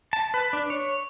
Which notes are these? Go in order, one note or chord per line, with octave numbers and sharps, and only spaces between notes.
A5
B4
D4
C#5